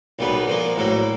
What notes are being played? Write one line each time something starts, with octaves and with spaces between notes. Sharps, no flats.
B1 A#2 G3 B3
A#2 F3 A#3
A#1 A2 F#3 A#3